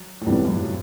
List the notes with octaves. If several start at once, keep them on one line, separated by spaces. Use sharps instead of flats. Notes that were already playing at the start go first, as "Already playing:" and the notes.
Already playing: F#3
A2
C2 G2 C3 E3 B3
F#2
G2
B2